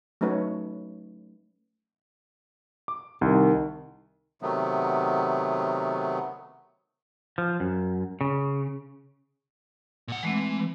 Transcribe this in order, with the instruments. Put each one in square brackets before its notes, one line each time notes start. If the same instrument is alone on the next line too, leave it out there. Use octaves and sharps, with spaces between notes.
[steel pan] F#3 A3 C#4 D#4 B4 C#5
[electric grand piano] D6
[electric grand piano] C2 [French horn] D#3
[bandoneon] C3 D#3 F#3 A3 B3
[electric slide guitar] F3
F#2
C#3
[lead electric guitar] A#2 F#5
[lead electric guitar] E3 [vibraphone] G#3 A3 C4